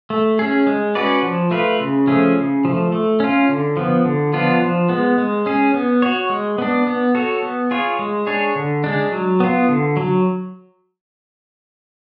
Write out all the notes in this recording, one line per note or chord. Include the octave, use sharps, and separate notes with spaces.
A3
C#4 G#4
G#3
C#4 F#4 B4 D5
F3
A3 F4 B4
C#3
F3 A3 C#4 G#4
C#3
F3 A3
A3
C#4 F4
D3
F3 B3
D3
F3 B3 D4 F4
F3
G#3 B3
G#3
C#4 G#4
B3
F#4 C#5
G#3
B3 D4
B3
F#4 A4 C#5
B3
F4 G#4 C#5
G#3
D4 G#4 C#5
D3
G#3 D4
F#3
B3 F4
D3
F#3